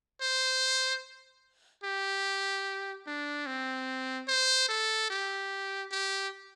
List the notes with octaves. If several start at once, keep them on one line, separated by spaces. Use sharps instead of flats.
C5
G4
D4
C4
C5
A4
G4
G4